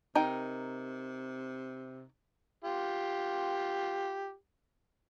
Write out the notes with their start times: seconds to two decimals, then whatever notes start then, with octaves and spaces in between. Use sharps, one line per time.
0.15 C3 D#4 A#4 G5
2.64 F4 G4